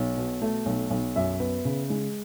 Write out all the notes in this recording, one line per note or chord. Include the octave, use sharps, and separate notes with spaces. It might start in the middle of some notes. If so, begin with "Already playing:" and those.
Already playing: B1
B2
A3
B1
B1
F#2 E5
B3
C#3
G#3